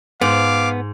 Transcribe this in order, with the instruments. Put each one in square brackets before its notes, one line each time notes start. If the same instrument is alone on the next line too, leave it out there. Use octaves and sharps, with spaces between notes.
[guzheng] G#2 [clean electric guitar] B3 [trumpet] F5 [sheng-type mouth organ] D6